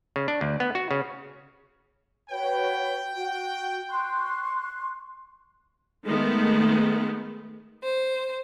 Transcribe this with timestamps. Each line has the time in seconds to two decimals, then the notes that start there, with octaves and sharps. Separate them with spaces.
0.16 C#3
0.28 D4
0.41 D2
0.60 B3
0.75 F#4
0.91 C#3
2.30 F#4 B4 C#5 G5
3.14 F#4
3.89 C6 C#6 F#6
6.04 D#3 G#3 A3 B3
7.84 C5